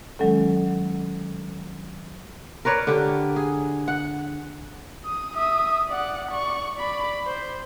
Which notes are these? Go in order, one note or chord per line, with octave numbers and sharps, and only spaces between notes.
D#3 F#3 G#3 C#4 A4
A#4 B4 C#5 D5
D3 G4
G#4
F#5
D#6
E5 D#6
D5 F#5
D5 C#6
D5 B5
C5